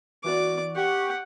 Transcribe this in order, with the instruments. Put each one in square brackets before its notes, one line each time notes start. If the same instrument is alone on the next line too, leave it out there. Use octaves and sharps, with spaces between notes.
[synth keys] E3 F#4 [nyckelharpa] D5 D6
[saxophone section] G4 [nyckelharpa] F#5 [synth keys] C#6